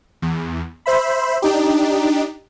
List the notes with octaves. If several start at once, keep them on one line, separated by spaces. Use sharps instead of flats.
E2
C5 E5 B5
D4 D#4 G4